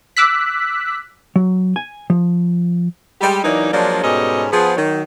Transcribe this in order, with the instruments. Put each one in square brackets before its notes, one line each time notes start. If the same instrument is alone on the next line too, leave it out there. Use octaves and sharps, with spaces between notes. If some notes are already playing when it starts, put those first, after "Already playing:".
[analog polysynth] D6 E6 F#6 B6
[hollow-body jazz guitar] F#3
G#5
F3
[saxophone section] G3 G#3 G4
E3 F#3 A#3 D4 D#4
F3 F#3 G#3 A#3 D4
G#2 B2 G3 C#4 A4 D#5
F3 B3 G#4
D#3 F#3